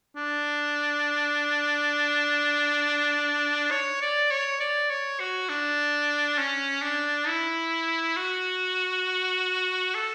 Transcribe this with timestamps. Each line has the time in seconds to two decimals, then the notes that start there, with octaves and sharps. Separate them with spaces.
0.16 D4
3.71 C#5
4.01 D5
4.31 C#5
4.60 D5
4.90 C#5
5.20 F#4
5.49 D4
6.38 C#4
6.82 D4
7.28 E4
8.16 F#4
9.95 A4